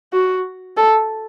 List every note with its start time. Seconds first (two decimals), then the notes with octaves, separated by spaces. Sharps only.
0.13 F#4
0.77 A4